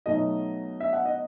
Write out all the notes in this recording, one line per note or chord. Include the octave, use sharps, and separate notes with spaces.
B2 F#3 A3 D#4 D#5
E5
F#5
D#5